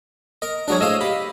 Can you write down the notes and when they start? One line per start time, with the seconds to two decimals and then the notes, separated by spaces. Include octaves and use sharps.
0.42 A#4 D#5
0.68 F#3 G#3 D4 F#4 A#4 C#5
0.81 A2 G#4 C5 D#5 F5 E6
1.01 G4 B5